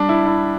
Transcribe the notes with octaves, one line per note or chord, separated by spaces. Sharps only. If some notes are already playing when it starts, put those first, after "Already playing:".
Already playing: G3 D4
E4
E4